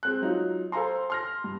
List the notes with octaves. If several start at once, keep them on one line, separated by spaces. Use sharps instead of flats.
G#3 C4 F#6
F#3 D#4 F4 F#4
A4 C5 F5 G#5 A#5 C6
C6 F6 A#6
G2